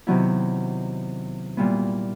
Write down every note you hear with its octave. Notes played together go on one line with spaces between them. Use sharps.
C3 D#3 F#3 B3 E4
A#2 G3 B3 E4